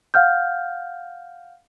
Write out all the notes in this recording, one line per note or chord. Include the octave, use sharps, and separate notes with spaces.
F5 F#5 F6 G6